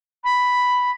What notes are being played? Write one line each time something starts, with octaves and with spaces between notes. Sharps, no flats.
B5